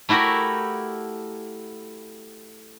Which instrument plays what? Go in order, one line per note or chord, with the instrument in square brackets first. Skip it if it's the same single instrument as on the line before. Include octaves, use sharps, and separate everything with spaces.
[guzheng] A3 E4 F#4 G4 A#4